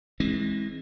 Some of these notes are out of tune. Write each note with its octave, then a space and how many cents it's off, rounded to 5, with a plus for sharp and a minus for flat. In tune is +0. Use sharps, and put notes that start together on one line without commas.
E3 -20 G#3 +0 C4 +25